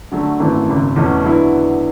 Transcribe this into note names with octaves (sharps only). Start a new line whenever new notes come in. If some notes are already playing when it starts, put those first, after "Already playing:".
D3 F#3 A3
G#1 F#2 E3 A3
G#1 F#2 C#3
E2 B2 A3 C#4
D3 F#3 B3 E4